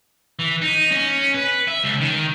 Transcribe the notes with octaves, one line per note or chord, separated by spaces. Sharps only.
E3
D#4
C#4
B4
E5
C#2
D#3